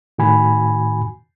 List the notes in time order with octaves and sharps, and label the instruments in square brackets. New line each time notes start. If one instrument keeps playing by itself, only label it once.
[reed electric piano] A2 D#3 F#4 G#5 B5